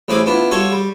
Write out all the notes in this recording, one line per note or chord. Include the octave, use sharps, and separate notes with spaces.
A1 A2 C4 G#4 B5 D6
B3 D4 E4 F4
G3 F4 F#4 A4 C#5 C#6
G3